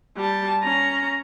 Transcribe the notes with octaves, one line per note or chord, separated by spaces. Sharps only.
G3 A5
C#4 A#5